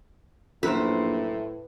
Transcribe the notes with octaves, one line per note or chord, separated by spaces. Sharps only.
A#1 F#2 A2 B4 C5